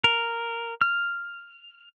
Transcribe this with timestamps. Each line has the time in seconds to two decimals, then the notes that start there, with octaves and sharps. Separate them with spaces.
0.04 A#4
0.81 F6